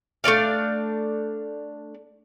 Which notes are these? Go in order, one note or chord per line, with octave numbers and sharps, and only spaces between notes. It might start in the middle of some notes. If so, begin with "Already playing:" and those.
A3 D4 D5 F5